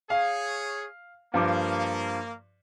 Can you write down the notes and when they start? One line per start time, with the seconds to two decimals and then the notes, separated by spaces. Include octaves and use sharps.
0.10 G#4 C#5 F5
1.34 G2 F3 A#3 D6